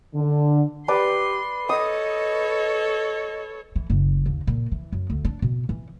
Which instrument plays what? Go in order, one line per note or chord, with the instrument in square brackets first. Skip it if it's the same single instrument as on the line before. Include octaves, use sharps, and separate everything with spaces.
[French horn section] D3
[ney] G4 [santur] B4 D5 B5 [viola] C6
[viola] A4 C#5 [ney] D#5 [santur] D#6
[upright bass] E3
F#1
D#2
A#2
E3
F#2
D2
D4
B2
E3